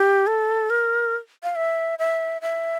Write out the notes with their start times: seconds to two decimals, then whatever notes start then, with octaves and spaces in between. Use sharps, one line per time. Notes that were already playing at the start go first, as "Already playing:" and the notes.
Already playing: G4
0.27 A4
0.70 A#4
1.43 F5
1.56 E5
1.99 E5
2.42 E5